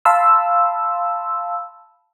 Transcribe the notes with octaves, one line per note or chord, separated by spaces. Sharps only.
F5 A5 B5 C6 E6